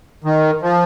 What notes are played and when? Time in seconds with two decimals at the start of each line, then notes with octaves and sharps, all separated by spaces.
0.24 D#3
0.62 F3